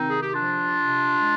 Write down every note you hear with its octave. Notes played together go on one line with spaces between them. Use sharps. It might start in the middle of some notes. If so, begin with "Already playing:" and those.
Already playing: C3 D#3 C4 D#4
G#4
G4
F3 D4 F4
C3
G#3